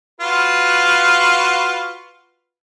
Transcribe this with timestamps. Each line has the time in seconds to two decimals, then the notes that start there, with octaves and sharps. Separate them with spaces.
0.21 F4 F#4 B4